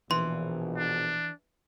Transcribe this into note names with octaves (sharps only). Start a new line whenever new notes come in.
A#1 B2 E3 C6
D4